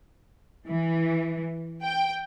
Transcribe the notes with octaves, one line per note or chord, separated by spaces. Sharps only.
E3
G5